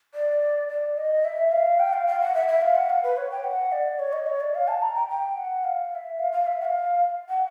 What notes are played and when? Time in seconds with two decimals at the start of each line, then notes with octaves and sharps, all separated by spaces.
0.14 D5
0.69 D5
0.97 D#5
1.25 E5
1.52 F5
1.79 G5
1.93 F5
2.07 F5
2.21 F#5
2.34 E5
2.48 E5
2.62 F5
2.76 F#5
2.90 F5
3.03 B4
3.17 C#5
3.31 G5
3.44 F#5
3.72 D5
3.99 C#5
4.13 D#5
4.26 C#5
4.40 D5
4.54 F5
4.68 A5
4.82 A#5
4.95 G5
5.09 G5
5.37 F#5
5.64 F5
5.92 F5
5.95 E5
6.19 F5
6.32 F5
6.46 E5
6.60 F#5
6.65 F5
7.29 F#5